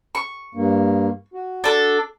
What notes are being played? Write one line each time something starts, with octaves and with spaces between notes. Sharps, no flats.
C#6
G2 A#3
F#4
D4 A4